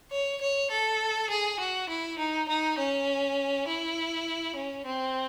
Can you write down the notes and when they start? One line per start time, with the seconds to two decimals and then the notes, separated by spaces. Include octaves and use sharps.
0.11 C#5
0.41 C#5
0.71 A4
1.30 G#4
1.60 F#4
1.89 E4
2.19 D#4
2.49 D#4
2.78 C#4
3.68 E4
4.56 C#4
4.86 C4